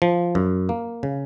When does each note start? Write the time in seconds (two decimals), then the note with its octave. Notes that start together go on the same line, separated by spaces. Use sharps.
0.02 F3
0.35 F#2
0.69 A#3
1.03 C#3